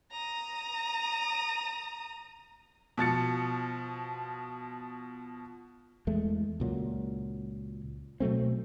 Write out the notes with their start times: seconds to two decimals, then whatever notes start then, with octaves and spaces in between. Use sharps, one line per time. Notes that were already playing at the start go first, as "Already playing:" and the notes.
0.12 A#5 D#6
2.98 B2 F3 A6 C#7
6.07 E2 G#3 A3
6.60 C#2 A#2 F#3
8.20 B2 F#3 A3 C4